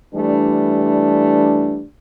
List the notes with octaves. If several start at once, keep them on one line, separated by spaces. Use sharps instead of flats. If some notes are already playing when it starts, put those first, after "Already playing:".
E3 G3 A3 D4